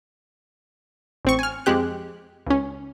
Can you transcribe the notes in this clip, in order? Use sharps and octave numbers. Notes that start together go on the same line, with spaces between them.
A1 C4 C#6
G#5 F6
F2 G#3 C4 G4 F#6
C#2 C#4